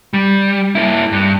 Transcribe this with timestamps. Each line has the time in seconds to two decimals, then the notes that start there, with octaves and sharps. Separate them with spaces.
0.14 G3
0.75 A#3 E4
1.12 G2